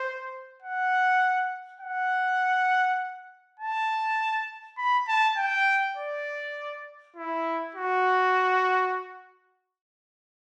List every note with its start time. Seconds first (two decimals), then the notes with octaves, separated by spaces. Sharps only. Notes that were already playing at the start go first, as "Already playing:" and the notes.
Already playing: C5
0.62 F#5
1.81 F#5
3.60 A5
4.78 B5
5.08 A5
5.37 G5
5.97 D5
7.16 E4
7.75 F#4